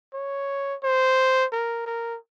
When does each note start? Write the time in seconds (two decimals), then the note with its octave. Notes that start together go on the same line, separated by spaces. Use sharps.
0.14 C#5
0.83 C5
1.52 A#4
1.86 A#4